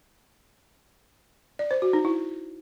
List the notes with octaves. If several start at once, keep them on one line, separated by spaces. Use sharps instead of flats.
D5
C5
F#4
D#4
E4